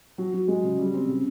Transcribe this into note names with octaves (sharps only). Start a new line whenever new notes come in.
F#3
F#3
G#3
C#3
G3
C4
C#3